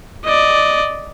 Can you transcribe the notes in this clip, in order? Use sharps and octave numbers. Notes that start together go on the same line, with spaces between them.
D5 D#5